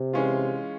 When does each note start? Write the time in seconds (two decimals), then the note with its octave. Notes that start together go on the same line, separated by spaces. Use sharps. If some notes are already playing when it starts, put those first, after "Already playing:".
Already playing: C3
0.13 E3 G#3 C#4 F4